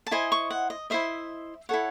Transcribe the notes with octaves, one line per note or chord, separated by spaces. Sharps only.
A5
E4 C5 D#5 G#5
C#6
F#5
D#5
E4 C5 D#5 E5
E4 A4 C#5 F#5